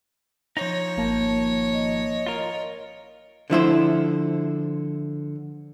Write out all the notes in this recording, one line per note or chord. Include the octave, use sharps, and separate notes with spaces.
F3 D#4 C#5
G#1 A#3 A5
D#5
F4 A#4
D3 F3 E4 C5